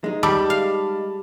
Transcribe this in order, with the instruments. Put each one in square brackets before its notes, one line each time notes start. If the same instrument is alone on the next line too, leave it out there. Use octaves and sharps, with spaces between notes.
[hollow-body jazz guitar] G#3 D#4
[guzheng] G3 [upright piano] A5 B5 D6
[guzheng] F5